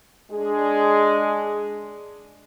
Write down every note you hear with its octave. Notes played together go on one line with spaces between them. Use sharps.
G#3 D4 G#4